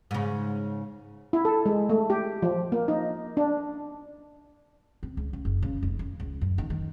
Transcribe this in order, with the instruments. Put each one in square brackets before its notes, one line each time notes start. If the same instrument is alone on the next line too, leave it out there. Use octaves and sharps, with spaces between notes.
[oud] G#2 C#3
[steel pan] E4
A4
G#3
A3
G4
F3
A#3
D#4
D4
[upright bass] C4
C#2
C#3
F#1
C#3
F1
F2
C#2
F#2
D#3
D#3